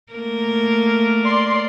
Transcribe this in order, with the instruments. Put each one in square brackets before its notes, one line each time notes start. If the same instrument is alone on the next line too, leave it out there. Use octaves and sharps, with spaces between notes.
[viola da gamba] A3 A#3 A#4
[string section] D5 C6